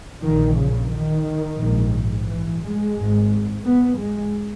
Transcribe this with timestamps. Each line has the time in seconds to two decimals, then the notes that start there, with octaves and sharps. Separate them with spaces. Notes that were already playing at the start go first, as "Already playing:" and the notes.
0.22 A#1 A#2 D#3
0.57 C#3
0.91 D#3
1.59 A#1 G#2
2.27 E3
2.62 G#3
2.96 G#1 G#2
3.64 B3
3.99 G#3